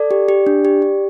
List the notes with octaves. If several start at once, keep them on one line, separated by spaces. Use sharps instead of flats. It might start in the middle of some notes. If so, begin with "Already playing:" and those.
Already playing: A4 D5
G4
G4
D4
G4
G4